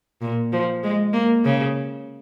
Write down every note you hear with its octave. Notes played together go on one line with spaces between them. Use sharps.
A#2
F3
G#3
A#3
C#3